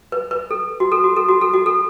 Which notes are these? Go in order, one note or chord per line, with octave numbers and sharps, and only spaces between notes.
B4
B4
A4
F#4
A4
F#4
A4
F#4
A4
F#4
A4